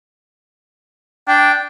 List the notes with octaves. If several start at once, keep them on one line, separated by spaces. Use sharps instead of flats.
D4 G5